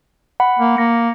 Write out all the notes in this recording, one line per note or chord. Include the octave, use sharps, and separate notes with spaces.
F#5 B5
A#3
A#3 A#6 C#7